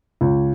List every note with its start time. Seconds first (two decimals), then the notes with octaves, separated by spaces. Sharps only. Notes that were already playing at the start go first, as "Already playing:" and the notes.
0.21 C#2